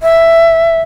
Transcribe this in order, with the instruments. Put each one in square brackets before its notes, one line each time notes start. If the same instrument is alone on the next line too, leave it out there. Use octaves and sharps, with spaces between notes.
[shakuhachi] E5